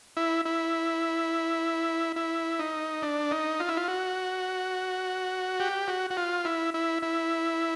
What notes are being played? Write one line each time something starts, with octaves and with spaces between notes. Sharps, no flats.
E4
E4
E4
D#4
D4
D#4
F4
E4
F4
F#4
G4
F#4
F#4
F4
E4
E4
E4